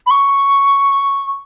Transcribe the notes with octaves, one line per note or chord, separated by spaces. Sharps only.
B5
C#6